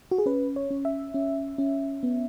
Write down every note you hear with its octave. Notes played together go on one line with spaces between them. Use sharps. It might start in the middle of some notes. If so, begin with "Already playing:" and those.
F#4
G#4
C#4 B4
C#5
C#4
E5
C#4
C#4
B3